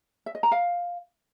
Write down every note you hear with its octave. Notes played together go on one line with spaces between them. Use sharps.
E5
D#5
A#5
F5